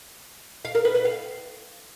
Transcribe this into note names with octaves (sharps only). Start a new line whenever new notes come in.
F5
A#4
B4
B4
F5